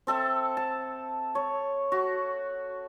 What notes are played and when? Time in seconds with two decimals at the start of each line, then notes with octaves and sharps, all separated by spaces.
0.07 C4 A4 E5
0.57 A5
1.35 C#5
1.92 F#4